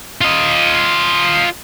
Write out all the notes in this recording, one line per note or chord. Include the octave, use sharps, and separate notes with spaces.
F4 D#5